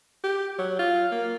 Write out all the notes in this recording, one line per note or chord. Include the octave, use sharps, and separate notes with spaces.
G4
F#3
F4
A#3